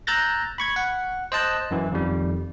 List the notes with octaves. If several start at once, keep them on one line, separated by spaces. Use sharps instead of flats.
A#5 E6 F#6 G6 A6 A#6
B5 C#6 G#6
F#5
C5 D#5 A5 F#6 G6
F#2 E3
F2 D#3 G3